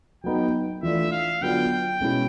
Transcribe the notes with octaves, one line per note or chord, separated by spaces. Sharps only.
F#3 B3 D#4 G5
E3 A3 D4 F4 E5
F5
D3 F#3 B3 D4 F4 G5
B2 G#3 C#4 E4